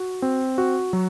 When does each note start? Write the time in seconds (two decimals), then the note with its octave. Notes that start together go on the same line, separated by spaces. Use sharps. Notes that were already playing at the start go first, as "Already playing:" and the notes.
Already playing: F#4
0.22 C4
0.58 F#4
0.93 F#3